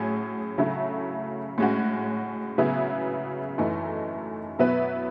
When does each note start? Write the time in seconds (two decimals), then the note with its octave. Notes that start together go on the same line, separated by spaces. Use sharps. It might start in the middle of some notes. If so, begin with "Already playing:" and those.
Already playing: A2 F#3 C#4 G#4
0.58 C#3 F#3 A3 E4
1.58 A2 G#3 C#4 F#4
2.58 C#3 F#3 B3 E4 G#4
3.58 F#2 E3 A3 D#4
4.59 B2 F#3 B3 E4 B4